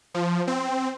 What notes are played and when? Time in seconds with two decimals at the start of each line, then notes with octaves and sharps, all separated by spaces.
0.14 F3
0.47 C4